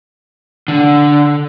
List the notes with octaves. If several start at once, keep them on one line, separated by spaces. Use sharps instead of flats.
D3